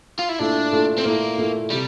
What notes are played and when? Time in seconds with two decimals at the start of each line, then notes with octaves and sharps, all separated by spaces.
0.19 F4
0.29 E4
0.39 A#2 A3 D4 E4 A4
0.72 A#2 A3 E4 A4
0.98 C4
1.05 A#2 A3 A#3 E4 A4
1.37 A#2 A3 E4 A4
1.70 C3 G3